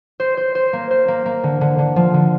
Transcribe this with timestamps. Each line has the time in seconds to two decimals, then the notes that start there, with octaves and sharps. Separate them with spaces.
0.20 C5
0.37 C5
0.55 C5
0.73 A#3
0.91 C5
1.08 A#3
1.26 A#3
1.44 D3
1.61 D3
1.79 D3
1.96 F3
2.14 D3